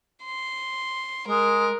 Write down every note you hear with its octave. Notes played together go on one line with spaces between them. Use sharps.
C6
G#3 A#4